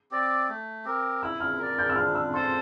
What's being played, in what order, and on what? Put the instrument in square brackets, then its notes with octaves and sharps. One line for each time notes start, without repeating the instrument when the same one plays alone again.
[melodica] C4 G4 D5
A3
C4 G4 A#4
[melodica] E4 [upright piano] E6
[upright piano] F6
[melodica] A#4 D5
[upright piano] G6
E6
[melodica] D4 [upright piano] F6
[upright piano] E6
[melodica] A4 C5 [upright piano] C6